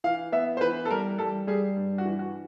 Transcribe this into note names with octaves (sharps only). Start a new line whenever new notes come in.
E3 F5
B3 E5
C5
E3 B4
A4
G3 A#4
G3 A4
G3 G#4
G2
F#4
E3
F#4